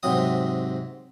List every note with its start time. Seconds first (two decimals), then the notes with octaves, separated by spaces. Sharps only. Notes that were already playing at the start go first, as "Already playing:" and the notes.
0.03 G#2 C3 F#3 D#6